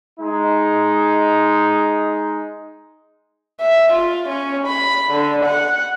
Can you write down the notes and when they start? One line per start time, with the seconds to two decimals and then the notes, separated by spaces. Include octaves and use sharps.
0.20 G#3 D#4
3.61 E5
3.93 F4
4.29 C#4
4.67 B5
5.10 D3
5.45 F#5